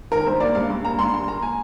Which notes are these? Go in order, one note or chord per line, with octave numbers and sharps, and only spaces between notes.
D#3 A#4
G2 C5
A#3 D5
G2 F5
G2
A#3 A#5
G2 C6
A#3 C6
A#3 A#5
G#5